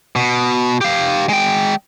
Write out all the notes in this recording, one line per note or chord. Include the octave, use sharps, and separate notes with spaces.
B2
G4 F5
G#3 G5